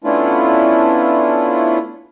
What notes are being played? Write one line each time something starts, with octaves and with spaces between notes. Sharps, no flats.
A3 B3 C#4 D4 E4 F4